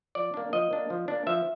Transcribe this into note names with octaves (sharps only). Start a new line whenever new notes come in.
F3 D5
A#3 D4
F3 D#5
A#3 D4
F3
A#3 D4
F3 E5